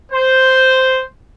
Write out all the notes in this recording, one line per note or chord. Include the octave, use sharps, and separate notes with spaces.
C5